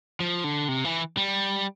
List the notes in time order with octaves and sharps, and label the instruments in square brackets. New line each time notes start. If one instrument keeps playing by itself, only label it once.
[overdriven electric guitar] F3
D3
C3
E3
G3